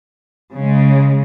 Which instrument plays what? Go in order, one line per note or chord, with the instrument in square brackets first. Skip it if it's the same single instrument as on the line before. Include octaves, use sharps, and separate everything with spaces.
[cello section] C#3 G#3